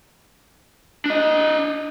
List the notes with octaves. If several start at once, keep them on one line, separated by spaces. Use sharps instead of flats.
D4 D#5